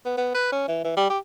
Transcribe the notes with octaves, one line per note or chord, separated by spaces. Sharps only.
B3
B3
B4
C#4
E3
E3
G3
G4